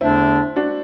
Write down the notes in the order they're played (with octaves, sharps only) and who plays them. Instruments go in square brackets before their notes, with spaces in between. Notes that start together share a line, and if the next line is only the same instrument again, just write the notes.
[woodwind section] E2 D3 A3 D4 [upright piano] C4 E4
[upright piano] D4 F#4